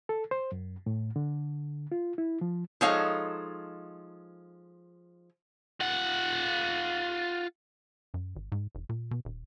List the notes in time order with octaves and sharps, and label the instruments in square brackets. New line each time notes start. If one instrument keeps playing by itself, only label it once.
[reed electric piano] A4
C5
F#2
A2
D3
F4
E4
F3
[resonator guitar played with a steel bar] F3 G#3 D#4 A4 C#5 F5
[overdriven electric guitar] F4 F#5
[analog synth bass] F#2
G#1
G#2
F1
A#2
B2
D#1